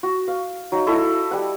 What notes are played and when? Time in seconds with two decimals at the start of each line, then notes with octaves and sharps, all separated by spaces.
0.03 F#4
0.28 F5
0.72 F#3 D#4
0.87 E4 F#4 A4 D#5
1.31 G3 F#5